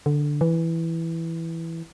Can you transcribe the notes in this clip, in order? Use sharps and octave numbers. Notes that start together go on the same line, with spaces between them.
D3
E3